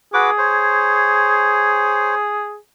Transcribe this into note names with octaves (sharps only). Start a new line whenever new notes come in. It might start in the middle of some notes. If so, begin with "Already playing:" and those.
F#4 G#4 B4 D6
C5 C#5